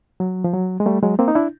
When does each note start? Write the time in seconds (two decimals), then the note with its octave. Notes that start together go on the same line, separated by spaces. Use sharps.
0.20 F#3
0.44 F3
0.54 F#3
0.80 G#3
0.86 G3 A3
1.02 F#3 G#3
1.19 A#3 C4
1.28 D#4
1.35 D4 E4